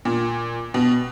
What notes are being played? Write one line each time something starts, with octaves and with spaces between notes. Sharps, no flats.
A#2
B2